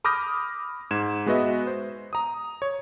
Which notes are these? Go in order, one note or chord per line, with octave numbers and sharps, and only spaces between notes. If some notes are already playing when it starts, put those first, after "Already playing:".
B5 D6 D#6 F6 G6 A#6
G#2 G#6 E7
G#3 B3 F#4 B4 D#5 E5
C5
A#5 D#6
C#5